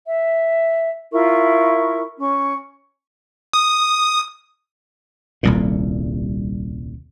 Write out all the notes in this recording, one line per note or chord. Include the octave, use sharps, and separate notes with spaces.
E5
E4 F4 A#4 C#6
C#4 C#6
D#6
D#1 C2 A#2